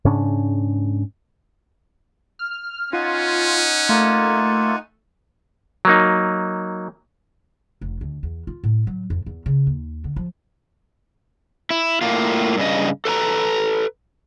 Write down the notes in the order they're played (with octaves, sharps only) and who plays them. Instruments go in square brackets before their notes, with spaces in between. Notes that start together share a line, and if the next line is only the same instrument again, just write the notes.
[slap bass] G#2 C#3 C#4 D4
[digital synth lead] F6
[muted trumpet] C#4 [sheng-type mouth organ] D#4 F#5 G#5 [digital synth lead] F4
[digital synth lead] A3 [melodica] A#3 F4
[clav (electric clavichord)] F#3 A#3 D#4
[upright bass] F1
D2
E2
F4
A2
F#3
F2
E2
C#3
D#2
D3
F3
[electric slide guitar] E4
A2 A#3 F4
G2 C#3 D#5
A4 B4 A5 A#5